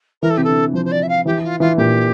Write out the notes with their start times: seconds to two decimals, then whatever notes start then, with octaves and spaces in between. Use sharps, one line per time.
0.22 E3 A#4
0.30 A4
0.37 C3 G4
0.44 D3 A4
0.73 F3 C5
0.85 C5
0.91 D5
1.03 E5
1.09 F5
1.26 E3 G4
1.44 F4
1.60 E3 F4
1.77 A#2 G4